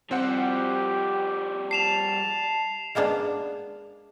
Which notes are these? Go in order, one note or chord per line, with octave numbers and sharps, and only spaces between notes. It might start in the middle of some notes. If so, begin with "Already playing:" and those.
F3 G3 C4 G4 C5 F#5
A5 C7 E7 F7
G#3 A#3 B3 D4